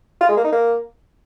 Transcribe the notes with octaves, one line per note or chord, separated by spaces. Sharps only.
F4
G#3
A#3
D#4
A#3